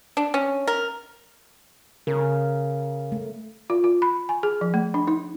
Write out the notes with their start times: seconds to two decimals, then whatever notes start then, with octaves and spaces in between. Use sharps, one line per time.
0.17 D4
0.34 C#4
0.67 A#4
2.07 C#3 A#4
3.12 A3
3.70 F4
3.84 F4
4.02 B5
4.29 G#5
4.43 G#4
4.61 F3
4.74 A3
4.94 D4
5.07 D#4